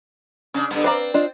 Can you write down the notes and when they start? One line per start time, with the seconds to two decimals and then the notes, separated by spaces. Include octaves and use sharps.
0.54 C#3 C#4 D4
0.71 G2 D3 B3
0.84 C4 B4 D5 F5 A#5
1.14 D4 F4 D#5